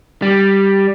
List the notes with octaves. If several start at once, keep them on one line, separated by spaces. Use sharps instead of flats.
G3